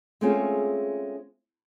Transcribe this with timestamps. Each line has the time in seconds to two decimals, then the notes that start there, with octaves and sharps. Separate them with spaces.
0.21 G#3 A3 C4 C#4 F4 G#4